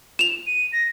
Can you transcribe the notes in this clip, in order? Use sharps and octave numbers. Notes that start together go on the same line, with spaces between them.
E7 F7
D#7
A#6